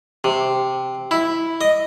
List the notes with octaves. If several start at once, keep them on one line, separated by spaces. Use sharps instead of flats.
C3
E4
D#5